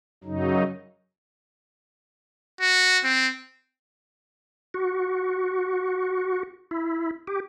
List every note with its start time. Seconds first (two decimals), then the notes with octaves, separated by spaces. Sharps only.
0.24 F#2 C#3 F#3 D#4
2.61 F#4
3.04 C4
4.74 F#4
6.71 E4
7.27 G4